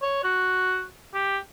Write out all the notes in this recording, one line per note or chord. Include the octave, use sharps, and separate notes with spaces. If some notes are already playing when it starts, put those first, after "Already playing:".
C#5
F#4
G4